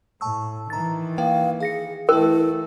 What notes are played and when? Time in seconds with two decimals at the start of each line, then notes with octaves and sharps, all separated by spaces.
0.21 A2 A5 C#6 E6
0.70 D#3 E3 A#5 A6
1.18 A#3 B4 F5 G5
1.60 G#4 F5 A#6 C#7
2.09 E3 A3 E4 A#4 B4 G5